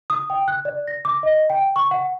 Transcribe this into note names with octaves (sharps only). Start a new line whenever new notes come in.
D#6
G5
F#6
D5
A#6
D6
D#5
G5
C#6
F#5